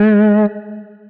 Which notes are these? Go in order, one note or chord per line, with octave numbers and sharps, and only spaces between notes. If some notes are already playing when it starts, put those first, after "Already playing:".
Already playing: G#3